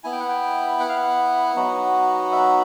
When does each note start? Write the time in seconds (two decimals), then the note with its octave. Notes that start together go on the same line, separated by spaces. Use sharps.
0.04 B3 E4 G#5
0.12 G5
0.20 F#5
0.29 G5
0.80 F#5
0.89 F5
0.97 F#5
1.56 F#3 B3 D#4 F#4
2.32 E5